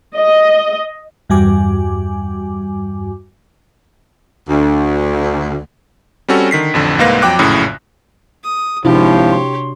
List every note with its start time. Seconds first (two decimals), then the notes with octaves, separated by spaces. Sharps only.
0.16 D#5
1.30 E2 G2 G3 F#4 G#5 D6
4.49 D2
6.28 G3 C4 C#4 F#4 A4
6.51 D3 D#3 B6 C7
6.74 A1 F2 D3
6.99 C2 G#2 A#3 B4 F5 A#6
7.22 F2 F#3 G5 D6 F#6
7.39 A#1 F#2 A2 C#3
8.44 D#6
8.85 G#1 C3 F3 D4 E4 F#4 G4 C#5
9.32 C6